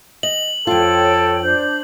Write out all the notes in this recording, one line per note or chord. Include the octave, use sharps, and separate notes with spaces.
D#5 F#7
F2 F4 A4 C#5 G5
D4 C5 G6